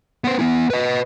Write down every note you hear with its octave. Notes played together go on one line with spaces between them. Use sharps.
B3 C5
B3 E4
B4 D#5